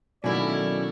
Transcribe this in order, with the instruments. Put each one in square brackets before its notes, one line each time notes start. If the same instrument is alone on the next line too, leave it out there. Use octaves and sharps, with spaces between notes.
[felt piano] B2 D#3 A3 [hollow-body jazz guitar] F#3 A#3 [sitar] C#4 E4 [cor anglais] D5